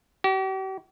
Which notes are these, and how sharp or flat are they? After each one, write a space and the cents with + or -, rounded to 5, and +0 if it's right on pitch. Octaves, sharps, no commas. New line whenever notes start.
G4 -45